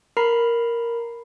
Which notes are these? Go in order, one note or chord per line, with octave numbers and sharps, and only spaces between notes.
A#4 A#5 B5 C7